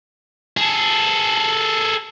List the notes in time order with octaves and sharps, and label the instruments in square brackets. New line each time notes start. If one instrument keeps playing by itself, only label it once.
[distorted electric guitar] G#4 A4